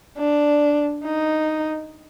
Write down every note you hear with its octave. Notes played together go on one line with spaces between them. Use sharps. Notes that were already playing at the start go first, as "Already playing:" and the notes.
D4
D#4